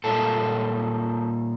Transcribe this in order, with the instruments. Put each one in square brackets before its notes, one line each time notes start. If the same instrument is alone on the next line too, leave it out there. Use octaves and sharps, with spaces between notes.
[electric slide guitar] A#2 G3 A#3 A4